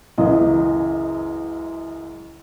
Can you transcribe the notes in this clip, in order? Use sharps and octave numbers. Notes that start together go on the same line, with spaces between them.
C#2 F#2 E3 E4 D#5